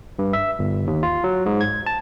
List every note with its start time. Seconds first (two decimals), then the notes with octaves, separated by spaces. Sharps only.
0.19 G2
0.33 E5
0.59 G1
0.87 D#2
1.03 F4
1.24 F#3
1.46 G#2
1.61 G#6
1.86 A5